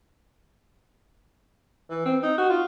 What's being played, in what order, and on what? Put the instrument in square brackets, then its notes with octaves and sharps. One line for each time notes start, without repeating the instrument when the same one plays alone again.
[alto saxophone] E3
C4
D#4
F#4
F4